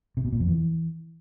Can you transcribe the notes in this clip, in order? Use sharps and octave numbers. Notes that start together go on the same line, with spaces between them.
C3
B2
A#2
F2
E3